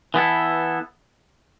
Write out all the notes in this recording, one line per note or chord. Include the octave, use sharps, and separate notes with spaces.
E3 B3 E4 A4